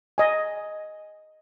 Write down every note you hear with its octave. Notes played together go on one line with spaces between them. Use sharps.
D#5 G#5